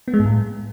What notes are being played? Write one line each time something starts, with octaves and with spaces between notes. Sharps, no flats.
B3
G#3
G#2
A2